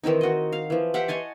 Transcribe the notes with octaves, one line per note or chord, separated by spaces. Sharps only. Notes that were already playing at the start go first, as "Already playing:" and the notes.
D#3 E3 C4 D#4
F#4 D#5
F5
E3 F3
G4 C5 E5 F#5
C#5 D#5 G#5 A5